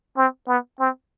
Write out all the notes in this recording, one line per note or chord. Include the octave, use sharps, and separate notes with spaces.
C4
B3
C4